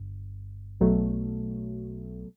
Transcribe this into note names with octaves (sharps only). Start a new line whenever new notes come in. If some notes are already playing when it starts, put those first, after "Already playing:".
Already playing: G1
B1 B2 F#3 A3